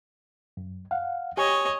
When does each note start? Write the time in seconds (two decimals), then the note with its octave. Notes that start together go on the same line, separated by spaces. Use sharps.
0.57 F#2
0.91 F5 F#5
1.37 G4 C#5 D#5 G#5 C#6